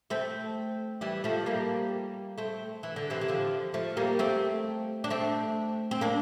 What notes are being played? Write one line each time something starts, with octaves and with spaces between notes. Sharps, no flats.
A3 C4
E3 G3
F3 A3
G3 A#3
A3 C4
E3
D3
C3 E3
E3
D3 F3
F3 A3
G3 A#3
A3 C4
D4
A3 C4
C4
A#3 D4